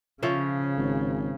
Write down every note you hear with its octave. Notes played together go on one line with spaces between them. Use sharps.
C#3 F3 C#4 E5
G#1